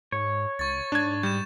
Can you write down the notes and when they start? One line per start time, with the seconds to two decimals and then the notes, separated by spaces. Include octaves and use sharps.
0.12 G#2 C#5
0.59 C#2 C#6 A6
0.92 G#2 D4 G#6
1.23 G3 G6 E7